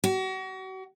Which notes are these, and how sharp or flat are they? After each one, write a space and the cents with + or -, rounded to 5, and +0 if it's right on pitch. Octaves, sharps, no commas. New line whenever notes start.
F#4 +35